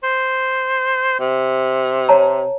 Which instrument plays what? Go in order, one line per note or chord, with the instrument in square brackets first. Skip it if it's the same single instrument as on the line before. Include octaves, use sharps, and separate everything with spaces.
[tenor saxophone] C5
C3
[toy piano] C#5 A5 A#5